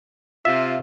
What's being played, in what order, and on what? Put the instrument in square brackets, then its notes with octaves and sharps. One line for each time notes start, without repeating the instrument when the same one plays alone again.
[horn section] C3 F4 [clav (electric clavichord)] E5